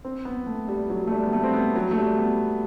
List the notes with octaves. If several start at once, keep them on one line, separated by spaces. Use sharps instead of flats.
C4
B3
A3
G3
F#3
A3
G3
B3
A3
C4
B3
F#3
A3
G3
B3